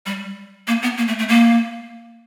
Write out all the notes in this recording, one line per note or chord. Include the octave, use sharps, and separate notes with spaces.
G3
A#3
B3
A#3
A3
A3
A#3